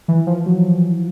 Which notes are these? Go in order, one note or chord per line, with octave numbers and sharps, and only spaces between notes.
E3
F3
F#3